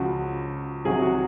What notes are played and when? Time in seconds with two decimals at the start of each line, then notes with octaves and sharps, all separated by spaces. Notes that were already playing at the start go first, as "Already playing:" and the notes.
Already playing: C#2 C#3 F3 F#4
0.85 C2 C3 D#3 F#3 G#4
1.02 F#4